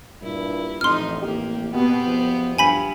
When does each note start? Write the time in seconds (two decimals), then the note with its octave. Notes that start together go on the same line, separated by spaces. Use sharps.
0.22 G2 A#2 E4
0.81 A1 F2 D#4 C6 F6
1.21 A1 A#3 G4
1.74 B2 B3 C4 G4
2.05 F#1 F3
2.58 G2 G#5 B5 B6